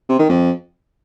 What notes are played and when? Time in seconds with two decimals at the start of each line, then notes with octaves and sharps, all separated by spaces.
0.09 C3
0.19 D#3
0.29 F2